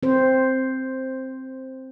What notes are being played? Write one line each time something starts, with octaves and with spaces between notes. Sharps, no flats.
C4 C5